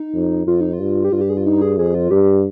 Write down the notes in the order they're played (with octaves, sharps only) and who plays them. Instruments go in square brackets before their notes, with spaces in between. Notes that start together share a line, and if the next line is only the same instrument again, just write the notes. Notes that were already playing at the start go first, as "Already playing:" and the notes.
Already playing: [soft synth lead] D#4
[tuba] F2
[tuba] F2 [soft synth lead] F4
[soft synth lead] D#4
F4
[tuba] G2
[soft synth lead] G4
[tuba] G2 [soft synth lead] F4
[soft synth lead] G4
G#4
F4
D#4
G#4
[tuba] F2 [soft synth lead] G#4
[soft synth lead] F4
[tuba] G2 [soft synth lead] G4